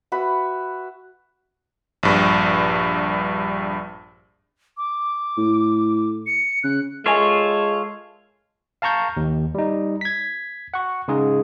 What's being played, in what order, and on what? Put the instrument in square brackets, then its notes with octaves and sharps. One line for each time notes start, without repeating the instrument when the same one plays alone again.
[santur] F#4 B4 E5 B5
[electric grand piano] A#1 G2
[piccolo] D6
[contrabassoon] A2
[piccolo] C#7
[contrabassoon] C#3 [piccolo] F#6
[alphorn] G#3 [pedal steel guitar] F4 A4 C#5 [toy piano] A#4 E5 G#5
[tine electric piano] F5 A5 A#5 C#6 G6
D#2
G3 D#4
G#6 B6
F#5 C#6
C#3 G#3 D#4 G#4